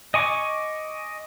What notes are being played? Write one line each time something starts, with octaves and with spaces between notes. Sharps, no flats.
D#5 G#5 C#6 D6